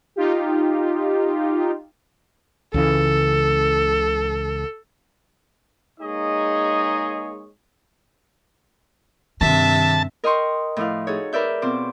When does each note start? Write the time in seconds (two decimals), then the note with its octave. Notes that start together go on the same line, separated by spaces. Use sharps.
0.16 D#4 F4 G4
2.74 C#2 C#3 E3 A4
6.00 G#3 A#3 D#4 G#4 C#5 D#5
9.41 G2 C3 D#3 E5 A5
10.24 A#4 D#5 G5 C6 C#6
10.76 A2 F3 E4 F5
11.07 D#4 F#4 G#4 A4 C#5
11.33 A#4 B4 D5 E5 G6
11.62 B2 C4 F4 C5 D6